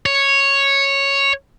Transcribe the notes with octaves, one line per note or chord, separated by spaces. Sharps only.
C#5